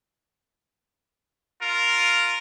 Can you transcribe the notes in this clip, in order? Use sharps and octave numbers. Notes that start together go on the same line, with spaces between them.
F4 A#4